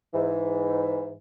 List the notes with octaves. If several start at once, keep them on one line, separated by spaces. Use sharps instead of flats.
G#2 E3